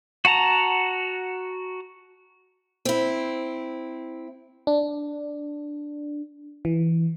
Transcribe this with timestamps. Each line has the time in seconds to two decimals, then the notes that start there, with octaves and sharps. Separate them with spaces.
0.25 F#4 F#5 A5 A#5
2.85 C4 E4
4.67 D4
6.65 E3